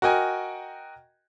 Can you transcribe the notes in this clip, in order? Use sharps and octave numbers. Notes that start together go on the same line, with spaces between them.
F#4 A#4 D#5 G5 G#5